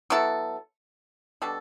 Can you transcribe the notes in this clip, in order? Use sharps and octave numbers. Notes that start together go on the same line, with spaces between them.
F#3 B3 E4 A4
B2 G3 D4 A4